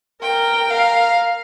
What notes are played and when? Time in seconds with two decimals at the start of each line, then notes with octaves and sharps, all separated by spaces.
0.22 A#4 G5
0.70 A#4 F5